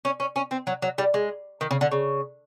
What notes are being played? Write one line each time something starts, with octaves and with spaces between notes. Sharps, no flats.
C#4
C#4
C#4
C4
F#3
F#3
G3
G#3
D#3
C#3
D3
C#3